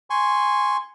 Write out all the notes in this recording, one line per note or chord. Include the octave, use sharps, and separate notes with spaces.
G#5 C6 C#6